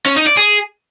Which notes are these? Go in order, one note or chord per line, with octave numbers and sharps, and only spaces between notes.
C#4
D#4
D5
G#4